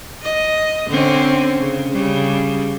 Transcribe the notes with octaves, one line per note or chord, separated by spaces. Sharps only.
D#5
D3 C4 C#4
C#3
C#3 G3